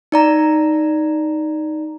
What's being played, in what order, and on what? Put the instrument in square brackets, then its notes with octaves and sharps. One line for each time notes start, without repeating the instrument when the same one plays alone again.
[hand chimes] D#4 D5 A#5